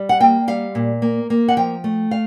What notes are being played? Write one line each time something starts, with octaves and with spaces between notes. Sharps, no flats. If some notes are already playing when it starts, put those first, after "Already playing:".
Already playing: G3
F#5
A#3 G5
G3 F5
A#2
A#3
A#3
F#5
F3 G5
A3
F5